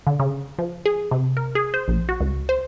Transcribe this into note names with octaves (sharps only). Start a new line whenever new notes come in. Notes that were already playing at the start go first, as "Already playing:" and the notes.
D3
C#3
F3
G#4
C3
A#4
G#4
C5
A#1
F#4
C#2
C5